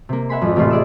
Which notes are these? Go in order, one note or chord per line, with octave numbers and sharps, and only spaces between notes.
C3 A#3
E5 F#5 G#5 B5 C6
G#1 F2
E1 A1 C3 A3 F4 C6
G#4 D5 D#5 E6